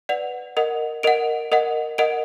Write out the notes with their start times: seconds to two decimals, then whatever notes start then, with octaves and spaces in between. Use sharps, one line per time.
0.09 B4 D5 F#5 F7
0.57 A#4 D#5 F#5
1.03 A#4 D#5 F#5 D7
1.52 A#4 D#5 F#5
1.98 A#4 D#5 F#5 D7